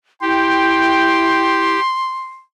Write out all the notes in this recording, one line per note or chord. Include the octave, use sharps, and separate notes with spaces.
E4 G4 G5 C6